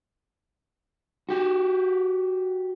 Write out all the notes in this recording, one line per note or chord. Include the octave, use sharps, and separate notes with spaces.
F#4 G4